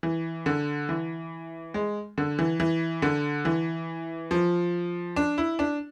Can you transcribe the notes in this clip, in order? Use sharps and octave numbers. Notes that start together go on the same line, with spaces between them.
E3
D3
E3
G#3
D3
E3
E3
D3
E3
F3
D4
E4
D4